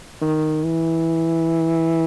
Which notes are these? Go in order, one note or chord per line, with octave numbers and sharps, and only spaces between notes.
D#3
E3